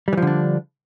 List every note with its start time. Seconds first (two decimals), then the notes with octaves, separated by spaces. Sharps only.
0.08 G3
0.13 E3
0.17 F3
0.22 D3
0.27 D4